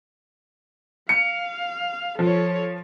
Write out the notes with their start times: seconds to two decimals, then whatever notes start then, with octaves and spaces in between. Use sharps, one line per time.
1.09 F5 C#7
2.19 F3 A4 C#5